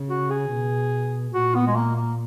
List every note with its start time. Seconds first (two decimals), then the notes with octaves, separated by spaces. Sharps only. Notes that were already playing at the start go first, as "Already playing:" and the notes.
Already playing: C#3
0.10 F#4
0.30 G#4
0.51 B2
1.33 A#2 F#4
1.55 B3
1.67 G#3
1.76 A#3
1.96 A#3